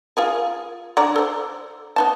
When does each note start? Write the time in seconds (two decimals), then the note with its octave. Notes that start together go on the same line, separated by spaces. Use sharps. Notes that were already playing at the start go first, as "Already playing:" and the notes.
0.17 F4 G#4 A#4
0.97 D3 D5 A#5
1.16 A4 C5
1.96 B3 D#4 A5